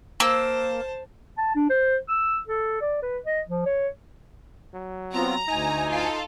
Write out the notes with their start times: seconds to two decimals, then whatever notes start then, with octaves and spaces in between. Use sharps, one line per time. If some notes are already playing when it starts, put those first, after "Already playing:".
0.20 A#3 C5 A5 E6
1.38 A5
1.55 D4
1.70 C5
2.08 E6
2.48 A4
2.81 D5
3.03 B4
3.25 D#5
3.47 F3
3.66 C#5
4.74 F#3
5.14 B3 C4 F4 A#5
5.48 D2 D#4 G#5
5.91 F4 A4